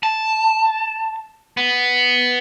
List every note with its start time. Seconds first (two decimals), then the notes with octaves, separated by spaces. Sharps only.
0.03 A5
1.57 B3